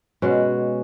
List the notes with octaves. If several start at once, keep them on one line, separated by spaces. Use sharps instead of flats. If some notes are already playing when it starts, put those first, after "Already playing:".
B2 G#3 C#4 F#4